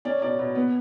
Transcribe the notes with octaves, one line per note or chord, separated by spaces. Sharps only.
C#4 D5
B2 D5
B2
B3